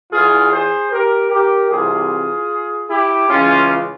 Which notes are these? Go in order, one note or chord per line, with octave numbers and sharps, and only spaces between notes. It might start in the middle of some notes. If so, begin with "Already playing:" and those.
E2 E3 F4 G#4
G#4 C5
G4 A#4
G4 A#4
C2 C3 E3 F4 G#4
E4 G4
C#2 C#3 E3 C#4 F4